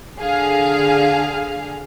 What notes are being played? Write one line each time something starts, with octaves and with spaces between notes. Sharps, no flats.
D3 G#4 F5